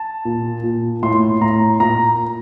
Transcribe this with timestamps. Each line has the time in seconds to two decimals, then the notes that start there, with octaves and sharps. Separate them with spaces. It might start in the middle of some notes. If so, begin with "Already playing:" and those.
Already playing: A5
0.25 A#2
0.63 A#2
1.03 A2 C6
1.41 A2 A#5
1.80 A#2 A#5